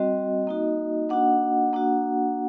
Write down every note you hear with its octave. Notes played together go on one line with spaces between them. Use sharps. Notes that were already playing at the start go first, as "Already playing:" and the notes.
Already playing: G3 C4 F#4 D#5
A#3 D#4 F#4
A#3 D4 F#4 F#5
A#3 D4 F#4